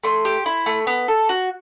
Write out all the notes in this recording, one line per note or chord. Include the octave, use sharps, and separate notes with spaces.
A3 C6
G4
E4
A3
B3
A4
F#4